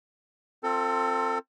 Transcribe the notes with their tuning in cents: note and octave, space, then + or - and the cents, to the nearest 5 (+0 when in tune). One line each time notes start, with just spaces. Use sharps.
C4 +10 F4 +0 A4 +30